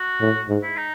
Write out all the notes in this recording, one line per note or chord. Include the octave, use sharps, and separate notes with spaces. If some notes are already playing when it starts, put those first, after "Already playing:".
Already playing: F#4
A2
G#2
E4
D#4